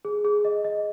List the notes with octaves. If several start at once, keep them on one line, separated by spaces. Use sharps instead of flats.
G#4
G#4
D#5
D#5